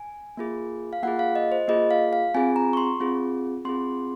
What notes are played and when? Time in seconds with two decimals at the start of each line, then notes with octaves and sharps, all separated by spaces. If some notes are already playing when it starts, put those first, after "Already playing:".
Already playing: G#5
0.37 A#3 F4 G#4
0.93 F5
1.03 A#3 F4 G#4 F#5
1.19 F5
1.35 D#5
1.52 C5
1.68 A#3 F4 G#4 D#5
1.91 F5
2.13 F5
2.35 C4 F4 G#4 G#5
2.56 A#5
2.73 C#6
2.77 C6
3.00 C4 F4 G#4
3.65 C4 F4 G#4 C6